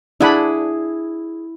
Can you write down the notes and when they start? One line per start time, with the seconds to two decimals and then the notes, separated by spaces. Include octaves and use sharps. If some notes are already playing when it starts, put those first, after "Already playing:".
0.21 D4 E4 G#4 F#5 B5